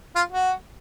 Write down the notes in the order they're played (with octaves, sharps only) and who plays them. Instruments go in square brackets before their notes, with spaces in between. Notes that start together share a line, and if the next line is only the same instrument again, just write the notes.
[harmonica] F4
F#4